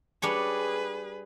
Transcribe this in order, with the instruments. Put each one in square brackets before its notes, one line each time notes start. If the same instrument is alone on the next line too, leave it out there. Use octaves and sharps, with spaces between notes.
[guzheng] G3 D4 C#5 [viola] G#4 B4